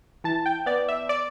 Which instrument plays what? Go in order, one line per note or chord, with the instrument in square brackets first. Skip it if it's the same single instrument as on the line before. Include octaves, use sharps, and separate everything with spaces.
[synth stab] E3 A5
G5
B3 D5
E5
D5